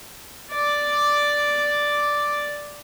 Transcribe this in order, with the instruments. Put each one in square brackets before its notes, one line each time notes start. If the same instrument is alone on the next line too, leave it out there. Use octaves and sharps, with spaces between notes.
[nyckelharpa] D5 D6